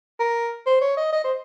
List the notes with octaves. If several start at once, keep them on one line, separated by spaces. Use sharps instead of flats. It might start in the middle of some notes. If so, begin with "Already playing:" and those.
A#4
C5
C#5
D#5
D#5
C5